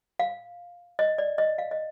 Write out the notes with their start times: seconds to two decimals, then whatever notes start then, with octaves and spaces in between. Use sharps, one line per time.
0.20 F5
0.99 D#5
1.18 D5
1.38 D#5
1.58 F5
1.71 D#5